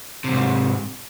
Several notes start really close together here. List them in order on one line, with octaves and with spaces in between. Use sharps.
C3 F2 G#2